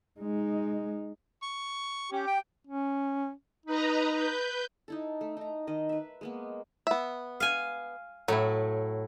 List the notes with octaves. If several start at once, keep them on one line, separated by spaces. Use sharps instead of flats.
G#3 D#4
C#6
C#4 G4
G5
C#4
D#4 B4 D#5 A#5
B4 G6
D#4 E4 A4
A3
D#4 A#5
D#3 D#5
B4 E5
G#3 A#3 B3
B3 E5
F5 G#5
A2 F#3 E4